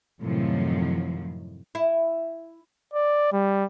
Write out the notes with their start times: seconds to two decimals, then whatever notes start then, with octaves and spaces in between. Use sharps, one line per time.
0.22 F#2 A2 C3 D#3 F3 F#3
1.75 E4
2.94 D5
3.33 G3